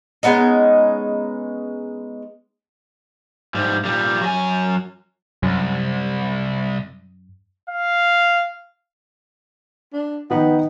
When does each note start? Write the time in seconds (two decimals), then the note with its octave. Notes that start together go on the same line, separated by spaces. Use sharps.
0.23 G#3 B3 C#4 D#4
3.55 G#2 G3
3.85 A#2 G3
4.21 F#3 G#5
5.43 C2 F#2
7.70 F5
9.93 D4
10.30 D#3 B3 D#4